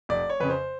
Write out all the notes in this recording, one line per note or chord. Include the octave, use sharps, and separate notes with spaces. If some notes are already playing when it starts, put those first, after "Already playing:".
F1 D5
C#5
F2 C#3 B4
C5